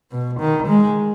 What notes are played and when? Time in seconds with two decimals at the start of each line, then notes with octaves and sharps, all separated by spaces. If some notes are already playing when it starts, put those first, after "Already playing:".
0.11 B2
0.40 D#3
0.68 G#3